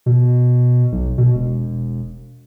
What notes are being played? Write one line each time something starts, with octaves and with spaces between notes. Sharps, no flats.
B2
B1
B2
E1